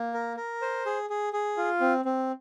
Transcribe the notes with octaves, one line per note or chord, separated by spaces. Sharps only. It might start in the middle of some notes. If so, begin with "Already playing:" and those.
Already playing: A#3
A#4
A#4
C5
G#4
G#4
G#4
F4
C4
C4